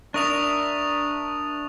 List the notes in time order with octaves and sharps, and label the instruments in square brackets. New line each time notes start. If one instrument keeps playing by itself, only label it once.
[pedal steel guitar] D4 A#4 E5 [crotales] C#6 D#6 F7